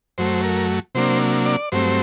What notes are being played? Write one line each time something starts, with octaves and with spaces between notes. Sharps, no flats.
F#2 F#3 A3 C5
A#4
C3 F#3 A#3 D4 C5
D5
G2 F#3 A3 C4 C5